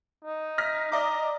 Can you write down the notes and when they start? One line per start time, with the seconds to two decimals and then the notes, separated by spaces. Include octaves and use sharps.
0.25 D#4
0.58 F6 A#6 B6
0.92 D5 D#5 A#5 D6